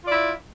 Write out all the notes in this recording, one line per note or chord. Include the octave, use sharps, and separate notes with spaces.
E4 F4 D5